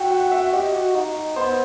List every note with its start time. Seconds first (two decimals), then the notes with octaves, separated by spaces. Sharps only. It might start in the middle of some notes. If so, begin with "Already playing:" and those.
Already playing: F#4 E5 G5
0.11 F#5
0.31 E5
0.53 G4 D#5
0.74 F#4
0.95 D#4
1.36 B3 C5